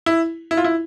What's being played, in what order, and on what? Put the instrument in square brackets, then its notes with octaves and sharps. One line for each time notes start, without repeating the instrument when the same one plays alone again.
[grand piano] E4
E4
F4
E4